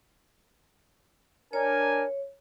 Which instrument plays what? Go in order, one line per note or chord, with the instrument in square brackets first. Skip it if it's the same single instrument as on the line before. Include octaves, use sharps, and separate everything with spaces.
[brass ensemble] D4 A#4 G#5 [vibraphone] C#5